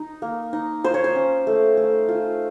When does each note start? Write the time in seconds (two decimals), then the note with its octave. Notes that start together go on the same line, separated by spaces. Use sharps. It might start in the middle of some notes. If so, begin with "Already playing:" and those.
Already playing: D#4
0.22 A#3
0.53 D#4
0.84 F4 C5
0.94 C#5
1.04 C5
1.15 C#4
1.47 A3
1.77 A3
2.09 F4